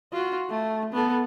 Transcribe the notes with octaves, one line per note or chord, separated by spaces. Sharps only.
F4 F#4
A3
B3 A4